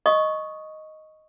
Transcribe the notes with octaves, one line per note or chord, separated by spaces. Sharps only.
D#5 C#6 D#6